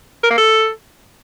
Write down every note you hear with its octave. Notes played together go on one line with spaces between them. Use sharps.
A#4
A#3
A4